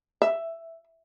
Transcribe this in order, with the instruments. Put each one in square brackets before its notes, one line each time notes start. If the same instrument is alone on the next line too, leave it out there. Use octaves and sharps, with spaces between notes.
[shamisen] E5